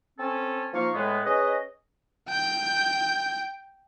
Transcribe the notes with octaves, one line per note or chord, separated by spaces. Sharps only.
C4 C#4 A4
F3 A#3 D#4 F5 C#6
A2 G#3 B3
C#4 G#4 B4 D#5
G5 G6